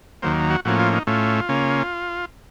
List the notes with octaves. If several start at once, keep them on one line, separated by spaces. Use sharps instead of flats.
D#2 D#3 F#3 A#3 C5
F#4
A2 F3 A#3 C#4 F#4
F4
D#4
A2 A3 C#4 F4
C#3 A#3 C#4